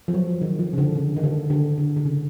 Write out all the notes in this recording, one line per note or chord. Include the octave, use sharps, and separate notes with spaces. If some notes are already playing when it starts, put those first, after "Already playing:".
F3
F#3
D#3
F3
C#3
D3
C#3
D#3
D3
D3
D3
D3
C#3